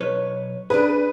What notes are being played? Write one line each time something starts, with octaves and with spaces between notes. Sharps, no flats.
B1 B4 C#5
D4 G#4 B4